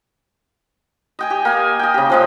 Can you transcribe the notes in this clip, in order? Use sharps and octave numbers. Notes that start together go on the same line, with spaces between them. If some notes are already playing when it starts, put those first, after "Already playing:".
D#5 G5 G#5
G4
A#3 G#5
D#5 G5
C#3 G4
F3 G#3 C#4